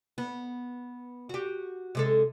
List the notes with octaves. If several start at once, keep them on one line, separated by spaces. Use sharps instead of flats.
B3
F#4 G4
C3 G#3 A4